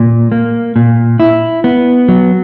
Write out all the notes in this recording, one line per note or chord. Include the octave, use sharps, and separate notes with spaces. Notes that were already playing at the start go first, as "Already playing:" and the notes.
Already playing: A#2
A#3
A#2
E4
B3
F#3